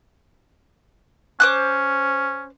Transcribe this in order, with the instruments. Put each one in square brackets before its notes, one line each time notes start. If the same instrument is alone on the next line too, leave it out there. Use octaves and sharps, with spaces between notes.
[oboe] C#4 [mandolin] C5 D6 F#6